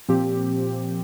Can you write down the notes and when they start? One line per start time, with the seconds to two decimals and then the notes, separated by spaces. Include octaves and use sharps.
0.08 A#2 F3 C4 G4